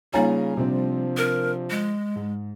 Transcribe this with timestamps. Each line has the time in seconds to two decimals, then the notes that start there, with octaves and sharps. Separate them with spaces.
0.14 C#3 G3 A#3 D#4 F4 C#5 G#5 A#5
0.57 C3 F3 C4 D4
1.17 A#4
1.70 G#3
2.16 G#2